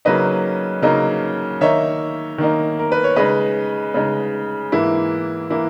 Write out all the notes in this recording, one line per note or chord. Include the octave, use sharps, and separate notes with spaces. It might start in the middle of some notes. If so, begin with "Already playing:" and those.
C#3 F#3 A#3 D#4 B4 D#5
C#3 F#3 A#3 D#4
D#3 A#3 D#4 C#5 E5
D#3 A#3 D#4
A#4
B4
C#5
C#3 G#3 D#4 B4 D#5
C#3 G#3 D#4
G#2 E3 A#3 E4
E3 A#3 E4